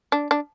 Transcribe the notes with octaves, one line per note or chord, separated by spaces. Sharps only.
D4
D4